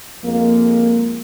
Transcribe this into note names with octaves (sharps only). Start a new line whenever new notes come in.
F2 G#3 A#3